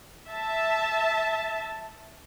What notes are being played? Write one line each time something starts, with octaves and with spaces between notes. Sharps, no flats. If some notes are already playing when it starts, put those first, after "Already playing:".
E5 A5